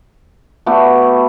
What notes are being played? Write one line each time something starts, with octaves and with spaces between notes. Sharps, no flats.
A3 B3 F#4 G4